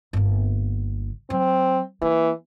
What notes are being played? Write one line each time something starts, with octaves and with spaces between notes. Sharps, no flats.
G1 A#3
F#3 C4
E3 A#3